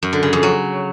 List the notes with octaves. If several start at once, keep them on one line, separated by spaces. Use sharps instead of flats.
F#2
D3
C#3
F2
F#3